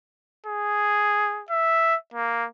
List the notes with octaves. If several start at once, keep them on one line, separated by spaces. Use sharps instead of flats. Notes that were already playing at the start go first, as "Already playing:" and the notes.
G#4
E5
A#3